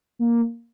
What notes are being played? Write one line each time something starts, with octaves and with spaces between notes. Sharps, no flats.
A#3